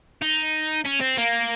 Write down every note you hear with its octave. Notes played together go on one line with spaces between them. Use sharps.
D#4
C#4
C4
A#3